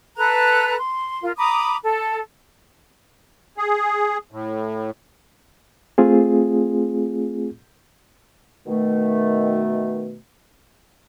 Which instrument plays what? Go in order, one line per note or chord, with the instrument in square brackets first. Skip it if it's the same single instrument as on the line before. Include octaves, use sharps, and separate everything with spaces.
[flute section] A4 B4 A#5 F#6
C6
F4 A#4
A#5 B5 D6 D#6
A4
[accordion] G#4
A2
[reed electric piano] A3 C4 F4 G#4
[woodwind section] B2 D#3 A3